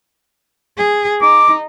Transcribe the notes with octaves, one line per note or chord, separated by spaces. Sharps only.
G#4
D#4 D6